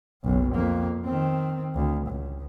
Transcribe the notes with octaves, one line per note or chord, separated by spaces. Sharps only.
F#1 B1
F2 A#3
D#3 C4
D2
C#2